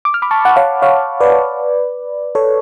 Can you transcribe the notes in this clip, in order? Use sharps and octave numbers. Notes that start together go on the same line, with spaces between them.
D6
F6
B5 D6
A5 C#6
F#5
C#5 F5
C#5 F5
B4 D5
A4 C#5